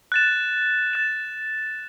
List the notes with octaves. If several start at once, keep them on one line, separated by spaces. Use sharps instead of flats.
F#6 A6 E7
F#6 A6 E7